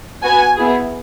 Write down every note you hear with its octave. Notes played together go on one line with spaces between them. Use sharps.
B3 F#4 G#5
B3 E4 G#4